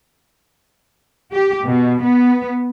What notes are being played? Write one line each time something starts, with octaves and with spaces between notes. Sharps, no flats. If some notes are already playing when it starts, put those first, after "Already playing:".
G4
B2
B3